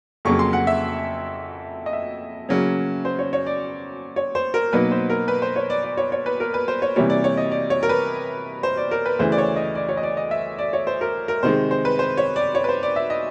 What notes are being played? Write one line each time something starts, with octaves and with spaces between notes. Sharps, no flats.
F2 C#3 F#3 A#3 C#6
C6
F#5
E5
D#5
E5
C#3 F#3 A#3 C#4
C5
C#5
C#5
D5
C#5
C5
A#4
B2 F#3 A#3 D#4 B4
C5
A#4
B4
C5
C#5
D5
D5
C#5
C#5
B4
A#4
B4
C5
C#5
C3 E3 G3 A#3 C#5
D5
C#5
D#5
D5
C#5
A#4
B4
C5
D5
A#4
B4
D2 C#3 E3 C5
D5
C#5
D#5
D5
C#5
D#5
D5
D#5
E5
D5
C#5
C5
A#4
A#4
C3 D#3 G#3 C5
C5
B4
C5
C#5
D5
C#5
B4
C5
D5
E5
D#5